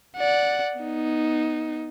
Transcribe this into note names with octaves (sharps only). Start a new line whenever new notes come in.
D5 F#5
B3 D#4